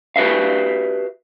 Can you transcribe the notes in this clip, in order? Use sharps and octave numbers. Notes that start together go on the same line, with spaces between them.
F#4 G4 B4 E5 F5